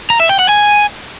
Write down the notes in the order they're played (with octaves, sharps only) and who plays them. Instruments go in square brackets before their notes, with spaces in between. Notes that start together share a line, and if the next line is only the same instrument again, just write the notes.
[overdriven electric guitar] A#5
E5
G5
F#5
G#5